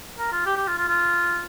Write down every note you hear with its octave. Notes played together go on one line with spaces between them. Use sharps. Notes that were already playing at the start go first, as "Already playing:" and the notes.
A#4
F4
G4
G4
F4
F4
F4